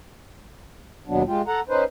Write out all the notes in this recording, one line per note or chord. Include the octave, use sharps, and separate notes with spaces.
D#2 B2 F#3 B3 D4
G#3 F4 G4
A4 F#5 A#5
C#4 D#4 B4 C5